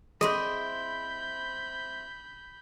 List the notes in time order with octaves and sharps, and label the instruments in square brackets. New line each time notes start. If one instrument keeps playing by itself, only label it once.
[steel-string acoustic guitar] C4 E4 C5 [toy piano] G#4 C6 [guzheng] D#5 [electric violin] B5 G6